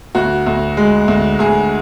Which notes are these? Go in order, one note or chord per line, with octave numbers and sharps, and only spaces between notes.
D2 F#4
D2
G#3
D2
D2 G#4